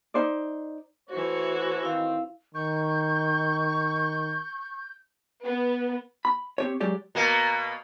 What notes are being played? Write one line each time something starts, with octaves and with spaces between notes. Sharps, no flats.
D#4 C5 D5
E3 A3 F#4 C5 C#5
D#3 C4 E4 F5
D#3 C#6 G6
B3
B5
C4 G4 C#5
F#3 G#3 G4 D5
B2 A#3